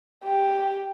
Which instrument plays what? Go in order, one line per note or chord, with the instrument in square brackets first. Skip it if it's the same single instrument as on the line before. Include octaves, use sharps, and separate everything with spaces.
[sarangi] G4